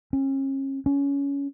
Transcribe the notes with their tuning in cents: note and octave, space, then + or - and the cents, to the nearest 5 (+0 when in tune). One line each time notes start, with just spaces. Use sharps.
C#4 -35
C#4 +20